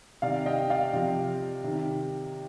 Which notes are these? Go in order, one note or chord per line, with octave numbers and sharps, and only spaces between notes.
C3 D#3 D5 F5
D#5 G5
D5 F5
C3 F3
C3 D#3